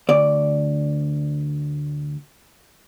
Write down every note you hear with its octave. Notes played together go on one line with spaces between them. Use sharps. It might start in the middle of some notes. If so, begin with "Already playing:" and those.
D2 D5